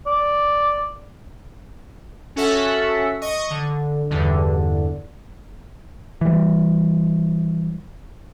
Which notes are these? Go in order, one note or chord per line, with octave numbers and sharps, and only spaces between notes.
D5
C#4 F#4 A4 E5 F#5
D#5 C#6 D#6
D3
E2 G2 D3
E3 G3